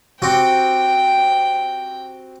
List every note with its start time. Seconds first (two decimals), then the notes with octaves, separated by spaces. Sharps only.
0.22 C4 F#4 G4 G5